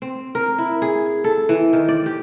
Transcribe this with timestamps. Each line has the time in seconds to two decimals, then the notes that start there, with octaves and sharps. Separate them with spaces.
0.02 C4
0.35 A#4
0.58 E4
0.82 G#4
1.24 A4
1.49 E3
1.73 D#3
1.88 D5
2.06 G4